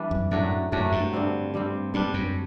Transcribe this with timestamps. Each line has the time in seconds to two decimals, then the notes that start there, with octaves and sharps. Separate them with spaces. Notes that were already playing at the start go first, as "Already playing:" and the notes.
Already playing: E3 G3 C4 D4
0.11 F#2
0.31 F#2 A2 F#3 A3 D4
0.72 F#2 A2 F#3 A3 D4
0.92 G2
1.13 D3 G3 C4
1.54 D3 G3 C4
1.94 G2 D3 G3 D4
2.14 F#2